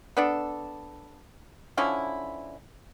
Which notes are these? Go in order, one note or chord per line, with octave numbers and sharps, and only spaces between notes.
B3 D4 A4
D3 F3 C#4 E4